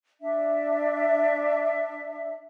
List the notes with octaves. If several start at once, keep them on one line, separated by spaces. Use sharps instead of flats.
D4 E5